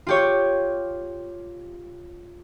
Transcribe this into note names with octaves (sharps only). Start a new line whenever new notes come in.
F4 G4 C#5